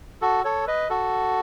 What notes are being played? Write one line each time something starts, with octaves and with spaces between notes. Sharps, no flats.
F#4 A4
A4 C#5
B4 D#5
F#4 A4